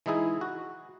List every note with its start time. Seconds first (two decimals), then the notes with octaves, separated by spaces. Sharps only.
0.06 E3 G#3 D#4 E4 G#4
0.41 F#4